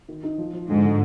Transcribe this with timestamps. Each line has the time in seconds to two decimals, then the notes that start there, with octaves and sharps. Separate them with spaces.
0.09 D#3
0.23 D#4
0.38 F3
0.53 F3
0.69 G#2 D3
0.84 D3